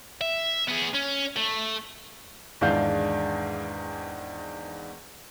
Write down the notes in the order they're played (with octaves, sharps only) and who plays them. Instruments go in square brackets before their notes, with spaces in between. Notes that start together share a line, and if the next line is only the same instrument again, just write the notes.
[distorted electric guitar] E5
B3 G#4
C#4
A3
[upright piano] E2 G#2 D#3 D4 F5 G6